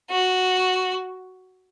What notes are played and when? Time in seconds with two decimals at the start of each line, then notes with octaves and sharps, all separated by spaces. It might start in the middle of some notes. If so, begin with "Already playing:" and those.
0.10 F#4